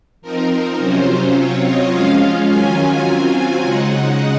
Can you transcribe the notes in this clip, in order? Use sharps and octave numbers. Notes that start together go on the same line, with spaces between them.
F3 C4 D#4 A#4
C3 F#3 C#4 F4 C5
F#3 C4 F4 C#5
D#5
F3 G#3 C#4 F4 F5
D#3 F#3 C#4 F4 G#5
F#3 C4 F4 G#5
C#3 G#3 D#4 F#5